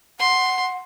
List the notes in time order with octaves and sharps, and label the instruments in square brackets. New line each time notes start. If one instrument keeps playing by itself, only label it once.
[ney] F#5 [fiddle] C6